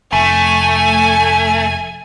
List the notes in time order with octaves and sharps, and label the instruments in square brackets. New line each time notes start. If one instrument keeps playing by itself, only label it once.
[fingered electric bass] F1 [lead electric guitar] A3 [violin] G#5